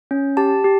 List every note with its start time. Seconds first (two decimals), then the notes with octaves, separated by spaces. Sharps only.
0.11 C#4
0.37 G4 A5
0.64 G4